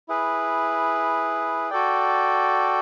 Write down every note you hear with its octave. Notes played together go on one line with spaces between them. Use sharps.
E4 G#4 B4
F#4 A4 D5 G5